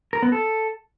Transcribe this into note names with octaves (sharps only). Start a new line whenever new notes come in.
A#4
B3
A4